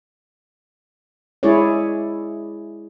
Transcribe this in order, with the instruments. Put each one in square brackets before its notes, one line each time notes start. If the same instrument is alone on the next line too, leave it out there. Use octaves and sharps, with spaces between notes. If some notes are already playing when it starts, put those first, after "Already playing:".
[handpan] G#3 E4 G#4 C#5 D5